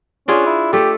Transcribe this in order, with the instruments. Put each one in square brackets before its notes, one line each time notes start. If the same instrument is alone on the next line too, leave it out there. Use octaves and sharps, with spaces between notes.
[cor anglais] C#4 [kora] D4 F4 G#4
[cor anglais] E4
[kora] A3 A4 [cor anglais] G4